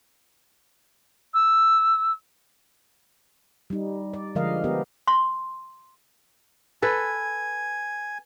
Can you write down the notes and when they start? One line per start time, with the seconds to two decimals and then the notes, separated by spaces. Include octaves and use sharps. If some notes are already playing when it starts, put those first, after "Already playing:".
1.33 E6
3.70 G3 D#4
4.14 D5
4.35 D3 F3 G#3 A#4 D#5 F5
4.64 B3 G4 A#4
5.07 C6
6.82 A4 B4 G#5